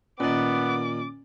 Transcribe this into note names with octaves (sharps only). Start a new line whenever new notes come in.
A#2 D#3 B3 C#4 D6 A6